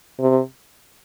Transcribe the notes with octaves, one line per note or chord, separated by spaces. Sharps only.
C3